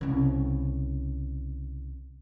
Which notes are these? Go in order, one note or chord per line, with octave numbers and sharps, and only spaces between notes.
C2 C#3